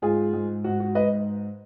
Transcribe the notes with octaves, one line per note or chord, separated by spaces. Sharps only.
G#2 F4 G#4
G#2
G#2 F#4
F#4
G#2 B4 D#5